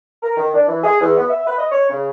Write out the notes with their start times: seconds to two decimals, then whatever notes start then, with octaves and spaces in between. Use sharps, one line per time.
0.23 A#4
0.36 D#3
0.54 D4
0.67 E3
0.84 G#4
1.01 E2
1.17 B3
1.30 E5
1.46 B4
1.58 D#5
1.71 C#5
1.90 C#3